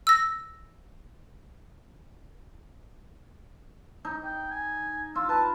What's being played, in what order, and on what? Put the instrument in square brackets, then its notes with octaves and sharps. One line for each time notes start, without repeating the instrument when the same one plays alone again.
[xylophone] E6 A#6
[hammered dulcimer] D#4
[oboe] G5
G#5
[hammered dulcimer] F4 [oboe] E6
[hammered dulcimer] B4 [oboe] A5